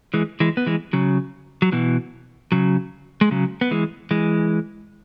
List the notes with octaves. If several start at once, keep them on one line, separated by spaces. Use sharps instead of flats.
E3 G#3
E3 G#3
B3
E3 G#3
C#3 F#3
F#3
B2 E3
C#3 F#3
G#3
C#3 F#3
B3
E3 G#3
E3 G#3